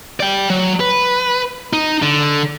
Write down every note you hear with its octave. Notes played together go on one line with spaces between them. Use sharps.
D5 G5
F#3
B4
D#4
D3